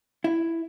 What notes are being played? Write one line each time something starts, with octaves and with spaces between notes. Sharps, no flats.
E4